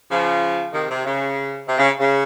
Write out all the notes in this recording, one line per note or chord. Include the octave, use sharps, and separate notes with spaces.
C#3 F3
C3 D#3
C3
C#3
C3
C#3
C#3